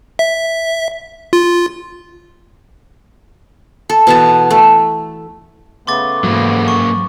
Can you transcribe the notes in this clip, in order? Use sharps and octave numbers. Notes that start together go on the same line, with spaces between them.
E5
F4
A4
B2 E3 A5
A3
C#3 A3 B3 C6 D6 A6
G#2 E3 F#3 A#3
C#6